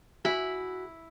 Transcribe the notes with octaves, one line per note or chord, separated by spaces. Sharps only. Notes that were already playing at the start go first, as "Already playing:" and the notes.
E4 F#4 G#4 E5 B5